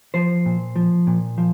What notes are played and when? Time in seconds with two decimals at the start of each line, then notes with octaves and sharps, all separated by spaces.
0.14 F3 C5
0.46 A#2
0.76 F3
1.07 A#2
1.38 F3